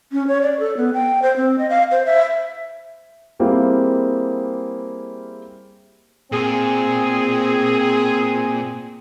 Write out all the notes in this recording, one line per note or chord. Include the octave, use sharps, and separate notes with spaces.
C#4
C#5
D5
A4
B3
G5
C5
C4
D#5
F5
C5
E5
G3 A#3 C4 E4 G#4 F5
A#2 C4 G#4